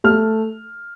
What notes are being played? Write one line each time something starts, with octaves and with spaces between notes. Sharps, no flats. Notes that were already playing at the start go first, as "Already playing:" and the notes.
A3 F6